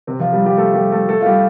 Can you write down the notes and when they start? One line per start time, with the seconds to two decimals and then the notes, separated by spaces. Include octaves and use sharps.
0.07 C3 C4
0.19 F3 F4
0.32 G3 G4
0.45 G3 G4
0.57 A3 A4
0.74 G3 G4
0.92 A3 A4
1.08 A3 A4
1.21 F4
1.25 G3 G4